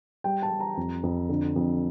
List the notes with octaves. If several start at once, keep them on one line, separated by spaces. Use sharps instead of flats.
G3 G5
A5
G3
A#5
F2
F2
D3
F2